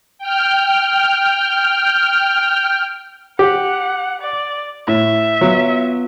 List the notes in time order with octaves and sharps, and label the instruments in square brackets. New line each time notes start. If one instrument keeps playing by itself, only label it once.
[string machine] G5 F6
[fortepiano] G4 [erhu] F#5
[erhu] D5
[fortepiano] A2 [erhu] E5
[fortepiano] F#3 [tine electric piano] B3 F4